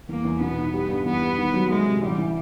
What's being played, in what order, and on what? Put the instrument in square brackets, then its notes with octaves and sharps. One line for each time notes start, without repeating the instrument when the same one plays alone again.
[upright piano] E2 [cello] A#3
[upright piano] E2
[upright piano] B2 [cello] B3
[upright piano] D#4
G3
G2
[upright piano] E2 [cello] B3
[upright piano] G3
D#3
F#3
[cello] G#3 [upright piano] A3
[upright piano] C3
[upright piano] A1 [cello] G3
[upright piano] E3